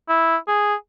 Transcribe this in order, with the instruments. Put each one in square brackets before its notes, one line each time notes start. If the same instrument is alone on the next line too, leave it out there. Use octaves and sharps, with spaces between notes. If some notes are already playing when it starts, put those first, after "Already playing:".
[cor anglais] E4
G#4